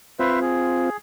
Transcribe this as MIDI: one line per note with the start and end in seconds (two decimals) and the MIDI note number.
0.19 0.90 60
0.19 0.90 65
0.19 0.40 71
0.19 0.40 72
0.19 0.40 76
0.41 0.97 68